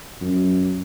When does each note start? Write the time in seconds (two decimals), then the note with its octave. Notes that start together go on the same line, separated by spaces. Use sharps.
0.21 F#2